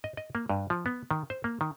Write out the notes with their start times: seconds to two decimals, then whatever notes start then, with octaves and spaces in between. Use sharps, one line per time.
0.04 D#5
0.17 D#5
0.35 A#3
0.49 G2
0.70 F3
0.86 B3
1.11 D#3
1.30 C5
1.44 A#3
1.61 D#3